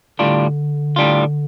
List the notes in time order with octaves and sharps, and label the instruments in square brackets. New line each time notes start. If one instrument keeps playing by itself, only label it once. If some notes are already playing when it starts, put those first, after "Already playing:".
[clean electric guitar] A2 G3 D4 F4 [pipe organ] D3
[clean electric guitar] A2 G3 D4 F4